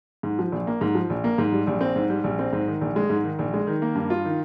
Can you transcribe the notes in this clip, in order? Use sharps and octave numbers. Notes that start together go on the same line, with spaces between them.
G#2
F3
A#1
A#3
G#2
F3
A#1
A#3
G#2
G3
A#1
C4
G#2
G3
A#1
C4
G#2
D#3
A#1
G#3
G#2
D#3
A#1
G#3
D#3
A#3
G2
F4
D#3